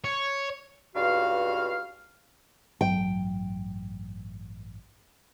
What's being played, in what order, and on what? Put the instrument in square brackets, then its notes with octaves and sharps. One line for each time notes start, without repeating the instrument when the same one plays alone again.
[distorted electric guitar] C#5
[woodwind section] C#2 G2 F#4 F5
[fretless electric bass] A1 G2 F#3 [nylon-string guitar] G5